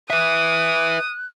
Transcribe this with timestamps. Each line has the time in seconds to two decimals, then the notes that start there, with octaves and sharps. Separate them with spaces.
0.10 B4 E5 D#6 F#6